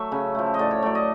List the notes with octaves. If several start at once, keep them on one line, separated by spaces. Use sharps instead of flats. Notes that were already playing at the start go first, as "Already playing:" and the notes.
Already playing: F#3 A3 E5
C#3
F3 A3
D#5
A2 D5
C#5
F#3 A3 D5
D#5